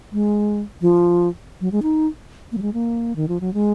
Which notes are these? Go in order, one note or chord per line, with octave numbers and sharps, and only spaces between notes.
G#3
F3
F#3
G#3
D#4
A#3
F#3
G#3
A#3
D#3
F3
F#3
G#3